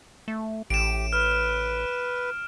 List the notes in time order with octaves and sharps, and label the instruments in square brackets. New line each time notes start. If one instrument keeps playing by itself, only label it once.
[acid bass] A3
[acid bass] A1 [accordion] G4 [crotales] D7 E7
[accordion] B4 [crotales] F6